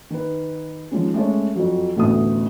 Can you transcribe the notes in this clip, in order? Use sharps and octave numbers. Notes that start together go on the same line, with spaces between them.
D#3 B4
D#3 F3 G#3 C#4
G#3 A3 C#4 C#5
F2 F#3
A1 D2 A3 B3 D#6